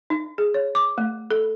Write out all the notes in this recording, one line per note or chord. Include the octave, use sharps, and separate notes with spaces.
D#4
G#4
C#5
D6
A3
A4